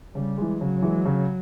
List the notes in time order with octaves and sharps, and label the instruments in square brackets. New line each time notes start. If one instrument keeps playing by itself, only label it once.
[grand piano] C#3 [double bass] G3
[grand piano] E3 G#3
[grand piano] C#3 [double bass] F#3
[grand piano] E3 G#3
C#3